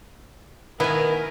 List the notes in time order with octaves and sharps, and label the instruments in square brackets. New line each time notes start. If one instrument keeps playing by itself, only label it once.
[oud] D#3 [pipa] B3 [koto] E4 G#5 [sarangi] A#4